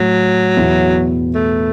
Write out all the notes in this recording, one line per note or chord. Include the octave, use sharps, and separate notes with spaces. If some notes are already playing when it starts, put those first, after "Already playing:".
Already playing: A2 F#3 A3
E2 B2 B3 E4
A3